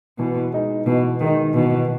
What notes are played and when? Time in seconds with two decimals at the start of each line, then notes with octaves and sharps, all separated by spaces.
0.19 B2 E3
0.52 G#3 D#4
0.86 B2 E3
1.21 D#3 G#3 D#4
1.54 B2 E3